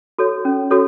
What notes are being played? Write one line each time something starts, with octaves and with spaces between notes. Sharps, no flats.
F#4 A4 C#5
C#4
F#4 A4 C#5